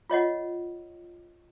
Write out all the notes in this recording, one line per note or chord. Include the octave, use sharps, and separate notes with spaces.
F4 C#5 D#5 F#5